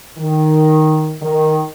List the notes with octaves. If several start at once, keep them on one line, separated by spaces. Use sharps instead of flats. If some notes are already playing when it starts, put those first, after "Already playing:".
D#3
D#3